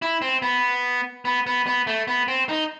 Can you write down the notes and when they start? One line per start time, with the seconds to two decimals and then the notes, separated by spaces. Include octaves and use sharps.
0.02 E4
0.22 C4
0.42 B3
1.25 B3
1.47 B3
1.67 B3
1.87 A3
2.08 B3
2.28 C4
2.49 D#4